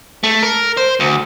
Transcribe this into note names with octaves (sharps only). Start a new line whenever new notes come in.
A3
A#4
C5
D2